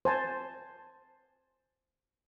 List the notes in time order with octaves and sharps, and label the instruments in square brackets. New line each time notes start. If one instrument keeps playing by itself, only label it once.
[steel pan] C5 G#5 A5